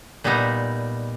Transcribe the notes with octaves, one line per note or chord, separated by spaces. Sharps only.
A#2 G3 B3 D#4